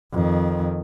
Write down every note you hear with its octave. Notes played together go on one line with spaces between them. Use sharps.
F2 D#3